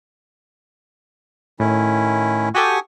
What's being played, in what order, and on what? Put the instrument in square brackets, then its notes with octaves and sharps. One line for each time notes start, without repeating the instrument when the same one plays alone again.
[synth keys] A2 [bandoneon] D#3 C#4 E4
[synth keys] F#4 G4 A4 [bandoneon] G#5 C#6 D#6